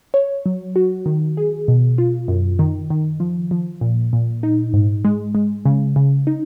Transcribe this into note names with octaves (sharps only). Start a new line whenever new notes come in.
C#5
F#3
F#4
D#3
G#4
B2
F4
F#2
D#3
D#3
F3
F3
A#2
A#2
D#4
G#2
G#3
G#3
C#3
C#3
D#4